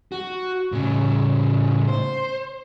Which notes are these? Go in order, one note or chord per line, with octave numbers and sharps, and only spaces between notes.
F#4
A2 C#3
C5